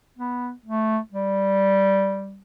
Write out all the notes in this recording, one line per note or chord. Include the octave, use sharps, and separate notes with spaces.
B3
A3
G3